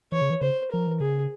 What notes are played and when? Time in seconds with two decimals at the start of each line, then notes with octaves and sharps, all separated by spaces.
0.12 E3 C#5
0.22 C#3
0.30 E3
0.41 C#3 C5
0.71 F3 A#4
0.87 E3
1.00 C#3 G#4